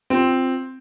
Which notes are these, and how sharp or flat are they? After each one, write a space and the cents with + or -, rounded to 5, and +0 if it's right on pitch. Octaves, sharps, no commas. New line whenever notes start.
C4 +0 F4 +0